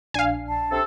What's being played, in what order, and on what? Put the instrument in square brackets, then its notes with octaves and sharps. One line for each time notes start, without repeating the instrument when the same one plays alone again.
[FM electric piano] A#1 D4 C7 [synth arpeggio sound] F5 G#5
[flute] A5
[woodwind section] C3 A4